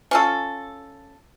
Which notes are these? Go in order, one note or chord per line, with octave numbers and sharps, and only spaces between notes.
C#4 F4 A4